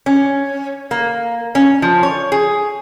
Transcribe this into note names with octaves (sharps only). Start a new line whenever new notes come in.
C#4
A#3
C#4
F3
C#5
G#4